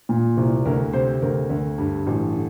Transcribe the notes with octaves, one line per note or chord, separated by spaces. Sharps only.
A#2
C2
D2 A#4
C3 C5
D2 A#4
D2
G2
A1
D3